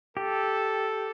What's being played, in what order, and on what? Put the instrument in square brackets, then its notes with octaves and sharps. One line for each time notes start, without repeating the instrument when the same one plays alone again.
[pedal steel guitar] G4 [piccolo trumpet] A4